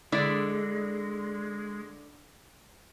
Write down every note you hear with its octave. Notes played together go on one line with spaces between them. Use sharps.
D3 G#3 E4 D5